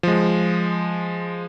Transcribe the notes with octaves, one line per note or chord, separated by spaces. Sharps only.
F3 G#3